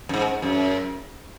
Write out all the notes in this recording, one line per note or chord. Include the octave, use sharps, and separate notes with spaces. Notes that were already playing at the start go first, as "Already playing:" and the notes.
F#2
G#2
F#2